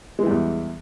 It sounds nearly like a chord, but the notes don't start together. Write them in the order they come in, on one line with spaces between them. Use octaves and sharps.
G#3 E3 G3 E2